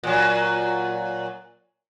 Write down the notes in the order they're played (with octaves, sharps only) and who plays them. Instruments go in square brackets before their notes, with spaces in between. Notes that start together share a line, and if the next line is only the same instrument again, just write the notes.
[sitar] A#2 F#3